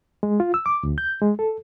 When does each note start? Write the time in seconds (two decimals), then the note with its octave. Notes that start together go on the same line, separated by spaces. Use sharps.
0.23 G#3
0.40 F4
0.54 E6
0.66 D6
0.83 D2
0.98 G6
1.22 G#3
1.39 A4